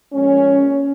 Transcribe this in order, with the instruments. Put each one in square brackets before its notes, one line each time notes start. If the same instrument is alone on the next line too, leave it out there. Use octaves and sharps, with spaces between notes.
[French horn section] A#2 F3 G#3 C#4